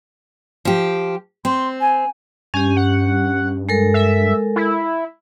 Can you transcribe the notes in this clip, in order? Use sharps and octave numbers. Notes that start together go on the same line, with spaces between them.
F3 G4
C4 C6
G#5
G2 C#4 G4 G#5
F#5
G#3 A4 A#4
E5
E4